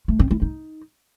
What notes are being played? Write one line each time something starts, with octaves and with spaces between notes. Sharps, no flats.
A3
C4
E4
D#4